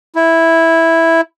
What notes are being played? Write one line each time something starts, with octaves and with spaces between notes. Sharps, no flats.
E4